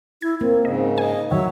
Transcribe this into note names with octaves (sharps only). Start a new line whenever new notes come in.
E4 G#6
A#3 C4
G#2 C#3 D#5
D#5 G#5
F2 A2 D#3 F#3 C#5 E5